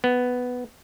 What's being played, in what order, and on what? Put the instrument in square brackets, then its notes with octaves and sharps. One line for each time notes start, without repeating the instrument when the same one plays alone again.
[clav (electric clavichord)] B3